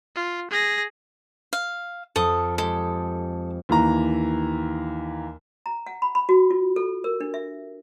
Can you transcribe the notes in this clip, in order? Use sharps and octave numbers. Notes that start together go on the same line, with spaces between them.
F4
G#4 A#6
F5
F2 A4 D#6
G#3 G4 A4
D#2 E3 A#5
A#5
F#5
B5
B5
F#4
F4
A4
A#4
D4
E5